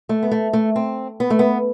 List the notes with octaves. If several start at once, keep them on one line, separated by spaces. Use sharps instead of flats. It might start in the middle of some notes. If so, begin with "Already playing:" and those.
A3
B3
A3
A3
C4
B3
A3
B3